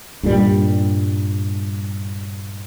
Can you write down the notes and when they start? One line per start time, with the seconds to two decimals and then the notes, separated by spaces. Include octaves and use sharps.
0.23 G2 A#2 G3